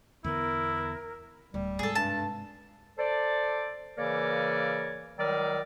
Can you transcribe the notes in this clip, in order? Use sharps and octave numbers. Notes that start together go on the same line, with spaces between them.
E2 D3 B3 E4 A#4
D1 G3
G#2 C3 G#4 A4
G2 A5
A4 C5 D5
C#3 E3 A#3 A#4 C#5 D5
C#2 D#3 F#3 G3 A#4 D5